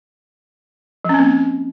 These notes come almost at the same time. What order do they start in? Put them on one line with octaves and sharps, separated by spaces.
F3 C#4 C4 A#3